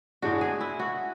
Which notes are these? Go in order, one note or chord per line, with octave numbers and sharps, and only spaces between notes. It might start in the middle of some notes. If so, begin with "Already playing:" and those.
A2 G#3 D4 F#4
G#4
E4
F#4